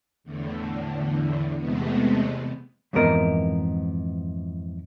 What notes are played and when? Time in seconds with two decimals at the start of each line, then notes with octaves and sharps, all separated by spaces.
0.24 E2 A2 D3
1.59 E2 C3 G#3 A3 B3
2.93 F2 G#2 E3 B3 A#4 D#5